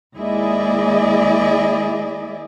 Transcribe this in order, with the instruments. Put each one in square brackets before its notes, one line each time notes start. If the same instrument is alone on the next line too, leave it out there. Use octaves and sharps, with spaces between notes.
[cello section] D#2 G#3 E4 G#4 D5 D#5